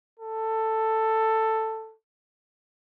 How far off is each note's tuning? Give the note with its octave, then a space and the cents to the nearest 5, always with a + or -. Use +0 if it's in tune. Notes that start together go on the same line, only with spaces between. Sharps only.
A4 +10